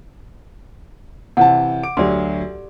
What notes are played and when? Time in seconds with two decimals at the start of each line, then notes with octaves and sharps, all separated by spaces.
1.37 C3 E3 F#5 A5
1.83 D6 D7
1.97 D2 F#3 G4 D5 C6